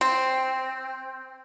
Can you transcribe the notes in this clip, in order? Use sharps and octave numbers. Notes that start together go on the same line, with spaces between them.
C4